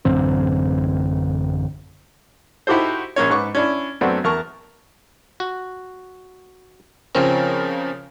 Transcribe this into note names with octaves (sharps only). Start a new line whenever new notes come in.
A1 F#2 D3 C4
D#4 E4 F#4 G4 A4 C5
A#1 A#3 C#4 C#5
G#2 B4 C#6 D6
C#4 D4 E4
F#2 A3 B3 C4 D4 F#4
E2 A#4 A5 C#6
F#4
C#3 F3 C4 C#4 A#4